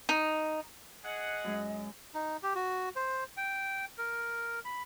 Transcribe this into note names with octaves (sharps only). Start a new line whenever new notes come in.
D#4
G#4 D#5 F#5
F#2 G#3
D#4
G4
F#4
C5
G5
A#4
B5